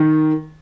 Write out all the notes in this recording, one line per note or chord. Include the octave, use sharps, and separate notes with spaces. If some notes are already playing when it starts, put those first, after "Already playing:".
Already playing: D#3